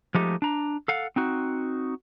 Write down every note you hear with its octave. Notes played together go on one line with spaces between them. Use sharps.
F3 G#3 A3 D#4 G4
D4 A#5
A4 F5 F#5
C4 D#4 F#4